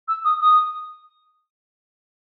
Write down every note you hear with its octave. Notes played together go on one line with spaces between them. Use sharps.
E6
D#6
D#6